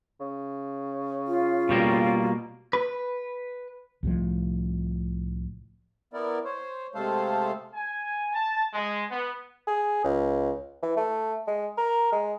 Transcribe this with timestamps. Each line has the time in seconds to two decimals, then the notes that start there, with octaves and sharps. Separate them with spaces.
0.20 C#3
1.27 F4
1.69 B2 G3 A#3
2.73 B4
4.03 C2 A2 F3
6.13 B3 E4 A#4 D5
6.45 C5 C#5
6.95 C3 G#3 A3 A4 C5 F5
7.74 G#5
8.33 A5
8.72 G#3
9.10 B3
9.67 G#4
10.04 C#2
10.83 E3
10.97 A3
11.47 G#3
11.78 A#4
12.12 G#3